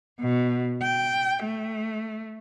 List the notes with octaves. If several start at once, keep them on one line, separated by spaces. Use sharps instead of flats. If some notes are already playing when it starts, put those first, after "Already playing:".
B2
G5
A3